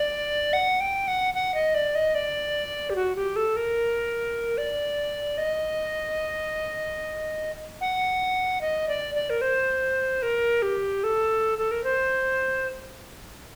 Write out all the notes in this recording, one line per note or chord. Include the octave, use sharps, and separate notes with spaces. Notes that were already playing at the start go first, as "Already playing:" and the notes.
Already playing: D5
F#5
G5
F#5
F#5
D#5
D5
D#5
D5
G4
F#4
G4
A4
A#4
D5
D#5
F#5
D#5
D5
D5
A#4
C5
A#4
G4
A4
A4
A#4
C5